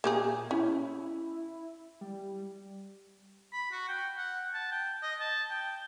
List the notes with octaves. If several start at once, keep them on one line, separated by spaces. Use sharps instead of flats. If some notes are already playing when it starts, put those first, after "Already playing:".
A#2 A#3 G4 G#4
C#4 E4
G3
B5
F#4
G5
F#5
A5
G5
D#5
A5
G5